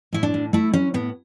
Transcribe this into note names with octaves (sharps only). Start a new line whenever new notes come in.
A2 E4
D4
A2
A3 E4
F#3 C#4
A2 B3